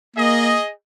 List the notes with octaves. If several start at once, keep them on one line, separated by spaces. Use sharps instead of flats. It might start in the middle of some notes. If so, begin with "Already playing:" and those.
A#3 G#4 D#5